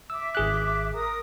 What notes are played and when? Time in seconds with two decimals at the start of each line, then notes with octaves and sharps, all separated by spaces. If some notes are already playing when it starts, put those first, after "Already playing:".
0.10 E5 D6 E6
0.35 G#1 G#4 F#6
0.94 A#4 D#6